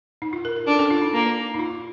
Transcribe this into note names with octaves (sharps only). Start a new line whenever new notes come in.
D#4
F4
A#4
A#4
D4 A4
A4
F4
D#4
A#3
D#4
F4